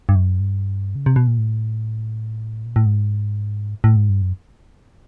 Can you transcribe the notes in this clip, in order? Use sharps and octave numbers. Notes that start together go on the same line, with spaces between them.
G2
F#2
G2
C#3
C3
B2
A#2
A2
A#2
A2
G#2
A2
G#2
G2
F#2